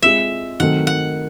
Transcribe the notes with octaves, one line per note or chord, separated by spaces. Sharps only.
G#3 C4 F4 E5
D#3 F#3 A3 C4 F#5
F#5